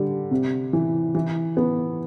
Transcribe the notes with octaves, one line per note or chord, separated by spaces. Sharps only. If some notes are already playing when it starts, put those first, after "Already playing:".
Already playing: D3 G3
C3
E3
E3
B3